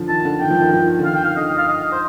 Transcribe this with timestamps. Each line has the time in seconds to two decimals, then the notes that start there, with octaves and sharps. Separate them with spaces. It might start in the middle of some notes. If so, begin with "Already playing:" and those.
Already playing: D3 F3
0.08 D#3 A5
0.25 D3
0.40 D#3 G5
0.50 F3
0.61 D#3
0.73 F3
0.99 D3
1.05 D#3 F5
1.14 G5
1.24 F5
1.37 D3 D#5
1.57 F5
1.68 D#5
1.92 C5